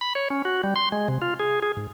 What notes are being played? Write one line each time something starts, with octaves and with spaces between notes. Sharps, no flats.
B5
C#5
C#4
F#4
G3
C6
G#3
C3
F4
G#4
G#4
G#2